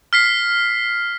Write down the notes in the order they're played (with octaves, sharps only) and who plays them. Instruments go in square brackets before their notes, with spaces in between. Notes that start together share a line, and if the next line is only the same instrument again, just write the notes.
[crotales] F6 B6 C7